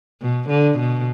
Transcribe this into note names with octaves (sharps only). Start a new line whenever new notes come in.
B2
D3
B2